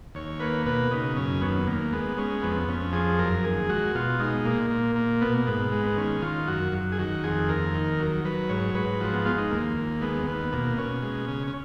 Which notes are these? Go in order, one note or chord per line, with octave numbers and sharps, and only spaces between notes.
D#2 C#5
A#3 B4
B2 B4
C#3 D#4
F#2 C#4
D#2 B3
D#2 A#3
G#3 B3
G#3 C#4
F2 B3
F2 C#4
F3 G#4
F#2 A#4
D#2 G#4
G#3 F#4
B2 F4
G#3 D#4
A#2 A#3
A#2
A#3
B2 B3
A#3
G#2 B3
G#3
B3
D#3 C#4
D#3 F4
F#2 F#4
F#2
G#4
D#3 F#4
F2 G#4
D#2 A#4
D#3
F#3
F#3 B4
G#2 C#5
G#2 B4
F3 F#4
B3
G#3 F4
D#4
D#2 A#3
D#2
G#3 B3
D#2 B3
B2 A#3
B2 C#4
G#3
C#3
C#4